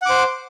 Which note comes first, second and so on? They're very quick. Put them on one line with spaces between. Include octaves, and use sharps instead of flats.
F#5 D6 C5